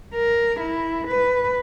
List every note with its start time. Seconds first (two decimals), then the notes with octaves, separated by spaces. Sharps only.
0.15 A#4
0.60 E4
1.08 B4